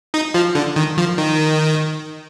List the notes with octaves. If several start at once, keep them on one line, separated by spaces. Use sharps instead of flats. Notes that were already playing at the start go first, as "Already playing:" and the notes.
D#4
F3
D3
D#3
F3
D#3